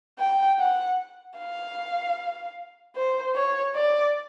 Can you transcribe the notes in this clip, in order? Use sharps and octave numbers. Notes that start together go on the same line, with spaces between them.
G5
F#5
F5
C5
C#5
D5